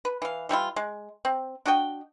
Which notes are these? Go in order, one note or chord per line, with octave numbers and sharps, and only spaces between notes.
B4
E3 F5
E3 G3 E4 F4
G#3
C4
D4 F#4 D#5 G5